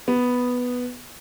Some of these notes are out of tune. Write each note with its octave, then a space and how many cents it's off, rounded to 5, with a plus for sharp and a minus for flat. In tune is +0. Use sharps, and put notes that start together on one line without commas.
B3 +0